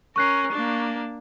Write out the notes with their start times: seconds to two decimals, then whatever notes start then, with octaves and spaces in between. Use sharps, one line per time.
0.16 C#4 A#4 C#6 F#6 C7
0.52 A#3 D4